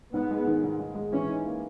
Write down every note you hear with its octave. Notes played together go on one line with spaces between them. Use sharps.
G#2 B3
G#3
D#3
G#2
G#2
G#3
E3 C#4
D#4
A#3